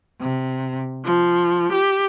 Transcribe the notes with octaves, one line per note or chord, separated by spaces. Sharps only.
C3
F3
G4